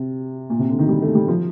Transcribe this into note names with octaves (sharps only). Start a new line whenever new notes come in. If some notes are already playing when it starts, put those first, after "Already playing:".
Already playing: C3
A#2
C3
D3
D#3
G3
A3
G3
F3